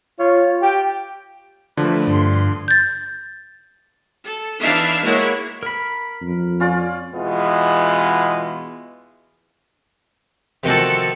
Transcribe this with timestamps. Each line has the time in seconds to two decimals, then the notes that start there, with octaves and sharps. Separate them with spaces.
0.19 F4 C#5
0.62 G4 G5
1.77 D3 F3 A3 B4
2.07 G2 C6
2.68 G6 A6
4.24 A4
4.62 E3 D4 D#4 E5 F5 A5
5.03 G#3 A#3 E4 F#4 C#5
5.63 A#4 B5
6.22 F2
6.60 C#4 F4 D5
7.14 B2 E3 G#3 B3 F4
10.64 C3 D#3 F3 F#4 A4